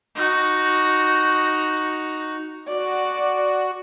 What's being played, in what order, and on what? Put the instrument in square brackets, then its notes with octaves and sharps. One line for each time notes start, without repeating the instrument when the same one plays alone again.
[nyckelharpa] D#4 F#4
[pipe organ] F#4 [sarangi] D5